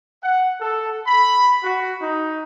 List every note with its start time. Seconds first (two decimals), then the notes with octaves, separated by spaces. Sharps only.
0.23 F#5
0.61 A4
1.05 B5
1.63 F#4
2.02 D#4